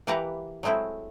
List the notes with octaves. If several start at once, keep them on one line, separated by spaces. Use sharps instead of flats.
E3 A#3 G4 B4 F#5 A#5
F#3 G#3 A3 C4 E4